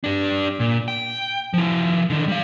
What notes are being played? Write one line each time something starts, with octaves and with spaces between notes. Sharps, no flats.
D4 G4
A#2
G5
F3 E4
D3 D#3
G3 F5